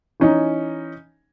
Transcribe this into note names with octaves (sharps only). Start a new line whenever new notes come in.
E3 C#4 D#4